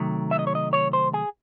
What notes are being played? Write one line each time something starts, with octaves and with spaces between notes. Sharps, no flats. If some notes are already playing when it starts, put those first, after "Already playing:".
Already playing: C3 D#3 F#3 A3
E5
D#5
C#5
D#5
C#5
C5
G#4